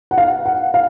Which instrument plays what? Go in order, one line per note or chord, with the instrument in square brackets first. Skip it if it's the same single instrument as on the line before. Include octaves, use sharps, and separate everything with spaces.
[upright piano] F#5
F5
F#5
F5